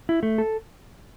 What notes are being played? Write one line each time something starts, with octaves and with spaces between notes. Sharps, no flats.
E4
A3
A4